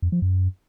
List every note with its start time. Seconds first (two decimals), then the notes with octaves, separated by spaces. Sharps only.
0.02 F2
0.12 F3
0.22 F#2